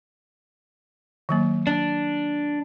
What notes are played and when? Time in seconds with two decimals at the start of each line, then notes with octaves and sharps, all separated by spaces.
1.29 D#3 F#3 A#3
1.67 D4